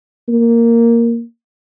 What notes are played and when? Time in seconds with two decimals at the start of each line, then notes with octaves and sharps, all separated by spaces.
0.28 A#3